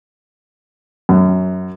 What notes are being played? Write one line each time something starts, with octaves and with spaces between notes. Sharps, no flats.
F#2